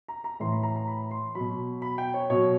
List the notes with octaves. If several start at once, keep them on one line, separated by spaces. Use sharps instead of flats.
A#5
A#5
A2 E3 C6
B5
A#5
A#5
B5
C6
B2 F#3 B5
B5
G5
C#5
B2 F#3 C#5